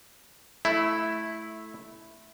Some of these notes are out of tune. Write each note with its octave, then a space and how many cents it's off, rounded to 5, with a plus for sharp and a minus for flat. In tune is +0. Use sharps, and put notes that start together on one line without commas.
A3 -15 E4 +0